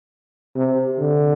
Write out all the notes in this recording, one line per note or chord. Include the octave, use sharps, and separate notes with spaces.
C3
D3